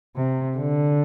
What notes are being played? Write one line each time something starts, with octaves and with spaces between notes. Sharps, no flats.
C3
D3